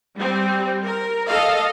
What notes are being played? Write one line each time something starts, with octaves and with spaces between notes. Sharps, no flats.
G3 C4
A#4
A4 D#5 F5